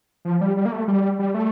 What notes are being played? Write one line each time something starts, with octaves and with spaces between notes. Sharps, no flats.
F3
G3
G3
A#3
A3
G3
G3
A3